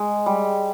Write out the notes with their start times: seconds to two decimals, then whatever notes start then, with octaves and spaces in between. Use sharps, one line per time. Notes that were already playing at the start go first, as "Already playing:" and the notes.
Already playing: G#3
0.26 G3